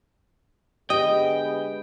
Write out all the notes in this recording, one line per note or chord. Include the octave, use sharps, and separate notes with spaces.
D3 G#3 B3 G4 B4 D#5 G5